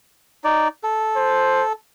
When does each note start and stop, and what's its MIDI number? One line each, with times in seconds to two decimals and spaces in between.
0.44 0.68 63
0.44 0.68 74
0.84 1.73 69
1.17 1.64 72